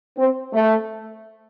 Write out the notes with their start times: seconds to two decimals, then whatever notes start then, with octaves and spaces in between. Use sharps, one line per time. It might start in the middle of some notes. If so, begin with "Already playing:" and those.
0.17 C4
0.53 A3